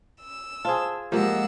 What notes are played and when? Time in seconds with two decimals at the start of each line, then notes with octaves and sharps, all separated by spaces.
0.21 E6
0.65 F4 G#4 C5 A5
1.12 F3 G#3 A#3 G4 F#5 E6